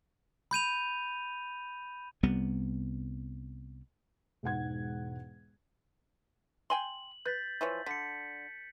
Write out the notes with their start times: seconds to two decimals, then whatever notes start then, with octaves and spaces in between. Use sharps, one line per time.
0.51 B5 G6 D#7 F7
2.23 C2 G3 B3
4.43 E1 G#2 F#5 G#6
6.70 G5 G#5 C6 F#7
7.25 B4 G6 A6 B6
7.61 E3 F3 C#5
7.86 D3 B6 C#7